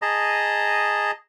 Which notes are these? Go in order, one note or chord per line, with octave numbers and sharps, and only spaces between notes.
G#4 D#5 A5 A#5